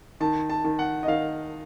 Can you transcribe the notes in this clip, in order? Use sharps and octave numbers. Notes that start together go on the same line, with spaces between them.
D#3 A5
A5
D#3
F#5
D#5
D#3 F5